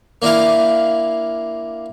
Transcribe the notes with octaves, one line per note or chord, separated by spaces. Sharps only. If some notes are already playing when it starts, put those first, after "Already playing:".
A#3 D4 E4 F5